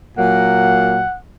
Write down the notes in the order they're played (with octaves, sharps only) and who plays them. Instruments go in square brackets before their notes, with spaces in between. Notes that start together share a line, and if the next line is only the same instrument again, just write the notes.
[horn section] A#2 F#3 A#3 F#5